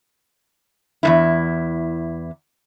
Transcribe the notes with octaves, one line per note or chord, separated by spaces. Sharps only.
E2 G#2 E4